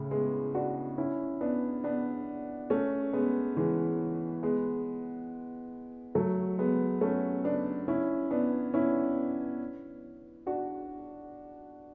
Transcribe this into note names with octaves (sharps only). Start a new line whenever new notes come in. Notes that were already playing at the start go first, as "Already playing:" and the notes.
Already playing: A2 C#3
G#3 B3
D4 F#4
C#4 E4
B3 D4
B3 D4
A3 C#4
G#3 B3
E3 G#3
G#3 B3
F#3 A3
G#3 B3
A3 C#4
B3 D4
C#4 E4
B3 D4
C#4 E4
D4 F#4